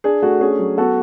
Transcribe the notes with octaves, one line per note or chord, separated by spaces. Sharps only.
D4 G#4
A3 F#4
C#4 G#4
F#3
B3 F#4 A4